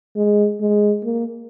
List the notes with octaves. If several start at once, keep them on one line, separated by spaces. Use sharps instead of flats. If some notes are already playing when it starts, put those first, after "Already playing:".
G#3
G#3
A#3